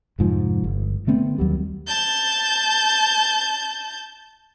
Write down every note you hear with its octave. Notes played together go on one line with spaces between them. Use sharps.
F1 G#2 F3
G1
D3 A3 B3 C4
D#2 F#3 G3
A5 G6